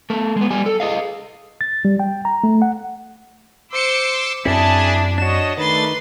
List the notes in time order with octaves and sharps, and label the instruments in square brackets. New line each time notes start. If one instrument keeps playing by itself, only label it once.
[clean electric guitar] A3 A#4
G#3 B3
G3 G#5
A4
G#4 D#5 F5
[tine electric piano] A6
G3
G5
A#5
A3
F#5
[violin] C5 C#7 [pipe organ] C6 D6 E6
[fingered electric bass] F#2 C4 [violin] D4 [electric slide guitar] E4 [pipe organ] G#4 G#5 A5
[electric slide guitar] D4 F#4 [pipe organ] C#5 D#5 [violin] E7
[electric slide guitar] D#3 [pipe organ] A3 D4 A6 [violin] B4 C6